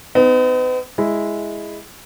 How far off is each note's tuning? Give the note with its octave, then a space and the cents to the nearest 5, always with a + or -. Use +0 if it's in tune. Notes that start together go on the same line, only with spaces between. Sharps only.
B3 +45 D#4 +0
G#3 +0 E4 +0